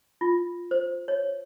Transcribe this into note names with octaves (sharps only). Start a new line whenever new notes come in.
F4
C5
C#5